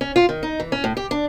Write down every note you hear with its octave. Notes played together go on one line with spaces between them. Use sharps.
C#4
F4
D#3
D#4
E3
C#4
A2
G4
D4